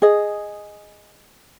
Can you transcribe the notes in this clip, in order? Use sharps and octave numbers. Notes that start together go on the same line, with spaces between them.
G#4 D#5